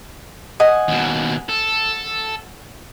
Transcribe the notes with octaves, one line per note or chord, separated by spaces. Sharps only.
D#5 F#5 G#5
D#2 B2
A4